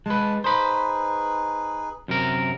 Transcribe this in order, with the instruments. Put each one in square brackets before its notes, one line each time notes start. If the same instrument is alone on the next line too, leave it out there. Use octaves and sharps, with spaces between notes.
[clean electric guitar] G#3 B4 [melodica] A5
[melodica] D#4 G#4 B4 [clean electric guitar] C5 B5
[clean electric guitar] F#2 C3 A#4